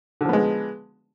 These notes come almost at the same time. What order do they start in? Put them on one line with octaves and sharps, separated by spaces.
D3 F3 B3 G#3